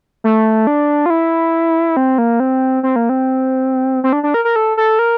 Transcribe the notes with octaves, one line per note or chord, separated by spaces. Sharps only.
A3
D4
F4
E4
C4
A#3
C4
C4
A#3
C4
C4
D4
D4
A#4
A#4
A4
A4
A#4